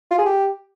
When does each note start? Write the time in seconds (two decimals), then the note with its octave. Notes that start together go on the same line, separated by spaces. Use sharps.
0.11 F4
0.18 G#4
0.26 G4